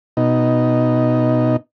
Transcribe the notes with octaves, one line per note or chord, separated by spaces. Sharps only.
B2 D#4